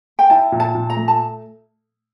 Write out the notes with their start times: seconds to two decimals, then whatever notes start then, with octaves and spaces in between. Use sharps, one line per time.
0.19 G5
0.30 E4 A5
0.52 A#2
0.60 A5
0.75 A#2
0.90 A#5
0.97 A3
1.08 A5